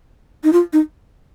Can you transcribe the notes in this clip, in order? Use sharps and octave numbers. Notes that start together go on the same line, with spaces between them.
D#4
F4
D#4